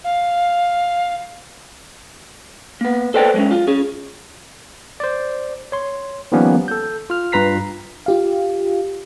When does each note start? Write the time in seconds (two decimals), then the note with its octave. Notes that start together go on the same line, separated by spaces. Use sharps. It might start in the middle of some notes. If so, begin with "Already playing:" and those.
0.04 F5
2.81 A#3 B3
3.14 A4 B4 C5 D5 G5
3.34 F#3 G#3 C#4
3.51 F4
3.67 C#4 G#4
5.00 C5 D5
5.72 C#5 C6
6.32 D#3 F3 G3 A#3 B3 C#4
6.68 A4 G6
7.10 F4 F6
7.32 G2 F4 B4 A#5 B6 C7
8.06 F4 G4 F5